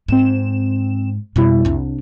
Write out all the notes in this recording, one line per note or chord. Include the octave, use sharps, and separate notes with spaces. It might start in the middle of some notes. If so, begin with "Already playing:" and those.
G#2 C4 E7
F2 B2 G3 E4
C2 D4